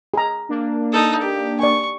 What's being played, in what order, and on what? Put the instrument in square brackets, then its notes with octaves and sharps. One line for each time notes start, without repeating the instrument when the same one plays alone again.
[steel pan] G#4 A#5
[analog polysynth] A#3 D4
[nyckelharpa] D#4 A4
G4
[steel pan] D5 G#5 [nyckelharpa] C#6